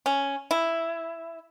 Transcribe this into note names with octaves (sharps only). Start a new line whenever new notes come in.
C#4
E4